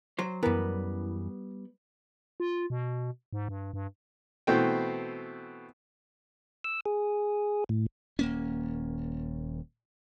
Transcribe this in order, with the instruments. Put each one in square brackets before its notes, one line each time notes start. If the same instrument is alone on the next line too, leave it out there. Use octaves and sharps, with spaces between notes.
[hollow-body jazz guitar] F#3 C5
[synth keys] F#2 E3 [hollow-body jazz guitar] G3 B3 [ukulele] A#4
[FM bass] F4
B2
G#2
G2
G2
[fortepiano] B2 E3 A3 C4 G5
[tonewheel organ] E6
G#4
A2
[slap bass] D#1 A#3 C#4